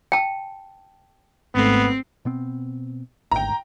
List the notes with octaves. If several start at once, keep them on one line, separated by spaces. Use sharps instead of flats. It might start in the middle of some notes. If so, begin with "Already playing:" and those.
G5 A5
G#1 G#2 A3 B3 C4
B2 B3 C4
G#1 D2 G#2 G5 A#5